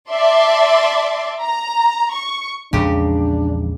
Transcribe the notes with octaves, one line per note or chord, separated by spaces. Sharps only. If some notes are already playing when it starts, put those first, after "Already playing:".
D5 E5 A5 C6 D6
A#5
C#6
A#1 E2 C#3 G#3 D4 G4